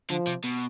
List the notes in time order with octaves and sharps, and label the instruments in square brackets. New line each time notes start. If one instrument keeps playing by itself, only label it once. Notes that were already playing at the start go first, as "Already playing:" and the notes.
[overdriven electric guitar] D3 [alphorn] F3
[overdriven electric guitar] C3
B2